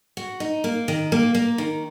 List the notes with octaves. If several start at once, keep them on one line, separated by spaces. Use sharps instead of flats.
F#4
D#4
A#3
D#3
A#3
A#3
D#3